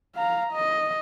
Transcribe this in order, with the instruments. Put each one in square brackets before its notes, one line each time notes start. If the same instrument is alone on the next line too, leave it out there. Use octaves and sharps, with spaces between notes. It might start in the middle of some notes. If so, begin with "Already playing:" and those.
[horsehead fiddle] F5 A#5
D#5